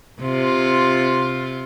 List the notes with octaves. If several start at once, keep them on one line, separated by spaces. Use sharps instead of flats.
C3 F4